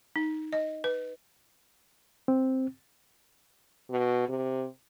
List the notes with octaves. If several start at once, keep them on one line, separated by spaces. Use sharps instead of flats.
D#4
D#5
B4
C4
B2
C3